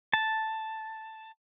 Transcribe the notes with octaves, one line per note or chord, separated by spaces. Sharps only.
A5